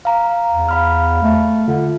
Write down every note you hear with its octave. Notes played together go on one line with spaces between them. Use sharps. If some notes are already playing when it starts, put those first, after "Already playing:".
F5 A#5
E2
F5 B5 F6
A3
D3 F4